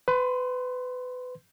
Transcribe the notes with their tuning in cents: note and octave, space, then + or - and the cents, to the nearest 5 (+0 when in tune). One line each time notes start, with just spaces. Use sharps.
B4 +25 C6 +0